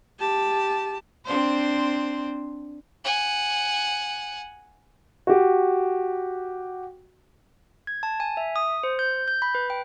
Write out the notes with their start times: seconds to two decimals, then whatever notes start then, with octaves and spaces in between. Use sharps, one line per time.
0.20 G4 A5
1.25 C4 D4 C5
3.04 F#5 G#5
5.27 F#4 G4
7.87 G#6
8.03 A5
8.20 G#5
8.37 E5
8.56 D#6
8.83 C5
8.99 G6
9.28 G6
9.42 B5
9.55 B4
9.70 G5